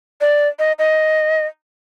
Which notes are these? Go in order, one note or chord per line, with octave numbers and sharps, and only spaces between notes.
D5
D#5
D#5